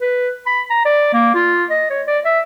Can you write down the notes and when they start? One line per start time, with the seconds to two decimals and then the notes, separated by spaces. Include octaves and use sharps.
0.01 B4
0.46 B5
0.70 A#5
0.85 D5
1.13 A#3
1.35 F4
1.70 D#5
1.90 C#5
2.07 D5
2.25 E5